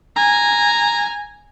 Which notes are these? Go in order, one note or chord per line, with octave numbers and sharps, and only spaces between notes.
G#5 A#5